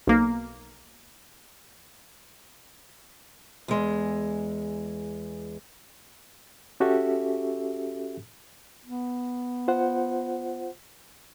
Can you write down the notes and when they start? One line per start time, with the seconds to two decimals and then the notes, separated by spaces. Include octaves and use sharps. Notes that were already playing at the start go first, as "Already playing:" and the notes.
0.07 B1 A#3
3.68 E2 G#3
6.80 C#4 F#4 G4 A4 E5
8.85 B3
9.68 F4 C5 F#5